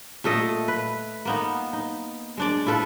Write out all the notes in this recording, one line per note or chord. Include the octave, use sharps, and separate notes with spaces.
A#2 A3 A4 D#5
B4
A#3 B3 D#4
D#4
G#3 D4 D5
E4 F4 A4 B4